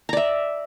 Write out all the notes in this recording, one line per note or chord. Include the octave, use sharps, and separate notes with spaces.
D5 E5 A#5